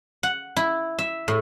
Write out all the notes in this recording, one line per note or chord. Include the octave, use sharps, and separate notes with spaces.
F#5
E4
E5
A2